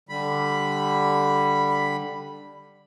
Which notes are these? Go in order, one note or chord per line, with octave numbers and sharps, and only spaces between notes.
D3 G3 B5